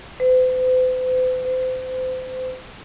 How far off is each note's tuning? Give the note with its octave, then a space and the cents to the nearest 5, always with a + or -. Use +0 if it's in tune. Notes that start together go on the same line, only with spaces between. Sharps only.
C5 -45
C5 -30